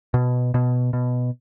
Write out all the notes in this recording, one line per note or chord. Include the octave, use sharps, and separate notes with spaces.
B2
B2
B2